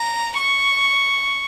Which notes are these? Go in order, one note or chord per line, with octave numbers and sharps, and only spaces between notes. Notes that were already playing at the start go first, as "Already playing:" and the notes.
Already playing: A#5
C#6